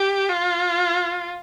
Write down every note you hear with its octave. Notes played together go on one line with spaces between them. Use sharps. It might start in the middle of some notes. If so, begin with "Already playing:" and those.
Already playing: G4
F4